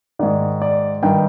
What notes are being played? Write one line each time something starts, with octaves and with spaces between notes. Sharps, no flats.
G#2 D#3 D5
D5
G2 D#3 G5